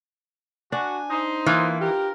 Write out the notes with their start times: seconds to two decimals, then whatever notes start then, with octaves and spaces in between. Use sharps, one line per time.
0.72 D4 F#4 G#5
1.10 D#4 C5
1.46 E3 A#3 F4
1.81 G4 A#4